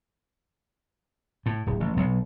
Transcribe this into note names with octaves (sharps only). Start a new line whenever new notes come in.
A2
D1
A1
B1